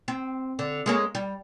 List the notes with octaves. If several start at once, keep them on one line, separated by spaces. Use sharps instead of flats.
C4
D3
G#3 A#3 C#4
G3